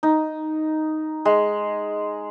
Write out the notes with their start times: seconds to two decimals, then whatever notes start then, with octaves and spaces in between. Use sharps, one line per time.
0.03 D#4
1.25 G#3